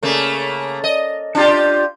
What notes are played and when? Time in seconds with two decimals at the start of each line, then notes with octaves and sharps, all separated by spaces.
0.03 C#3 A3 A#3
0.84 D#5
1.35 D4 F4 G4